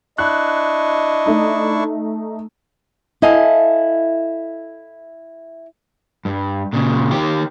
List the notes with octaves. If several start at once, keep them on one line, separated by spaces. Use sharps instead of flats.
D4 E4 D#5 C#6 F#6
A3 D#4
E4 A4 D#5 F5 G#5
G2
A#2 C#3
D#3 G4